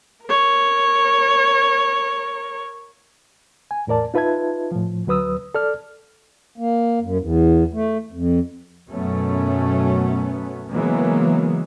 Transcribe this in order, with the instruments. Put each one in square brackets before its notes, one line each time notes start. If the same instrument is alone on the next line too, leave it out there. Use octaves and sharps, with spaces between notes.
[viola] A#4 C#5
[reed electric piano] G#5
E2 A2 A#4 D5 A5
D#4 F4 B4 E5 A5 G#6
A2 F3
D2 F#3 B4 D#6 E6
A4 D5 F6
[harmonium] A#3
F#2
E2
A3
F2
[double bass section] F#2 B2 F#3 A3 B3 C#4
C#3 E3 F#3 G#3 A#3 B3